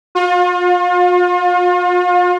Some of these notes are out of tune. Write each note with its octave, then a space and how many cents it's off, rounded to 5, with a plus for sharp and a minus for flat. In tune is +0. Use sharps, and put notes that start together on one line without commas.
F4 +40